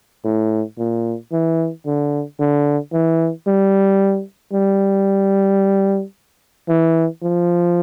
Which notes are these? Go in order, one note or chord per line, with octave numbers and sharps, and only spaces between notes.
A2
A#2
E3
D3
D3
E3
G3
G3
E3
F3